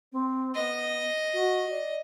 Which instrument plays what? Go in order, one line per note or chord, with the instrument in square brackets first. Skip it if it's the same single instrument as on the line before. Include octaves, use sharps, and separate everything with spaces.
[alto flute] C4
[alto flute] B3 [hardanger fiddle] D#5
[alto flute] F#4
D5